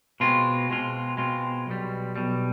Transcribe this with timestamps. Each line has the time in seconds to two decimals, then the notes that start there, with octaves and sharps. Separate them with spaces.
0.20 B2 G#3 C4 F4
0.70 B2 G#3 C4 F4
1.17 B2 G#3 C4 F4
1.66 B1 B2 G3
2.16 B1 B2 G3